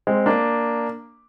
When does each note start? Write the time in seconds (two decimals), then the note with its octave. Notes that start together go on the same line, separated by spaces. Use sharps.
0.07 G#3 C4
0.26 A#3 D4